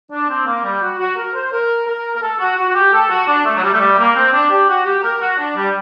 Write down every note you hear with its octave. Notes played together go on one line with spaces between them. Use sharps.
D4
C4
A#3
G3
F#4
F#4
A#4
C5
A#4
A#4
A#4
A4
F#4
F#4
F#4
G4
A4
F#4
D4
A3
F#3
G3
A3
G3
A#3
C4
D4
G4
F#4
G4
A#4
F#4
D4
G3